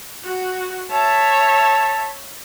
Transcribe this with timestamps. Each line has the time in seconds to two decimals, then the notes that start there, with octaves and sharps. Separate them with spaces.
0.24 F#4
0.91 C#5 E5 A5